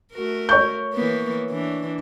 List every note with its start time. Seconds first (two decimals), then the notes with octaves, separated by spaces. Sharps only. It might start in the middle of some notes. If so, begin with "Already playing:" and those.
0.13 A3 F#4 A#4
0.49 C#5 C#6 G6
0.94 E3 A#3 B3
1.50 E3 D4